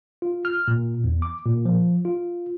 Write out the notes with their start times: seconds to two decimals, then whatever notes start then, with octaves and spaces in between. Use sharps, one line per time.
0.22 F4
0.45 F6
0.68 A#2
1.04 E2
1.22 D6
1.46 A#2
1.65 F3
2.05 F4